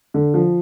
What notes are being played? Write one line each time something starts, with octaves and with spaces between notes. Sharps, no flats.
D3
F3